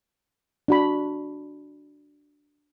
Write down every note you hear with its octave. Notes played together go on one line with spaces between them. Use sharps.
D4 F#4 B5